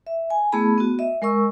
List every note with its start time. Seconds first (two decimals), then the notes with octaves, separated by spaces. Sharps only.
0.07 E5
0.30 G#5
0.52 A3 B3 E4 G#4 A5 B5
0.78 B3 F#4
0.99 D#5 E5
1.22 G#3 A#4 D#5 C#6 E6